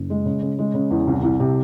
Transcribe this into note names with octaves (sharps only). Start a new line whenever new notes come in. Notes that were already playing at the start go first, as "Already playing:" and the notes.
Already playing: F#1
G#3
C#3
C#3
G#3
C#3
E2
C2
C2
C3